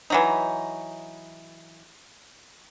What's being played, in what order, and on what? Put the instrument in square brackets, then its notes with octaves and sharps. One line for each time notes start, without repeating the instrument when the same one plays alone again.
[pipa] E3 F#3 D#4